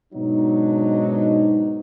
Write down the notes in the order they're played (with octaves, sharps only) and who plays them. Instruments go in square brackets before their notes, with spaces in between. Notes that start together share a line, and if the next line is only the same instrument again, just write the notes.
[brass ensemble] G#2 B2 F#3 D4 D#4